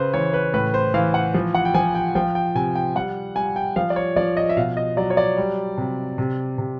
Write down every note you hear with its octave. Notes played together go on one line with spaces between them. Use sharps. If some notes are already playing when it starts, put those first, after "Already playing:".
Already playing: C#3 B4 C5
E3 C#5
B4
A2 B4
C5
E3 F5
F#5
F3
F#5
G5
F3 G#5
G5
F3 G5
G5
C3 G#5
G5
G3 F#5
G3 G#5
G5
F3 F5
D5
C#5
F3 D5
D#5
E5
B2 F5
D#5
F#3 D5
C#5
D5
G3
C3
C3
C3